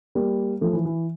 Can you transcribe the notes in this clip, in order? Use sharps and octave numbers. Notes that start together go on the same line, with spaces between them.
G3 A#3
F3 A3
E3
E3